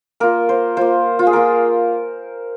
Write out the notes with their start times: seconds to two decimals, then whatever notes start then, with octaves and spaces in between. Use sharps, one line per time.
0.20 A#3 F4 A#4
0.49 C5
0.77 A#3 F4 C5
1.19 F4
1.27 G#4
1.33 A#3 F4 A#4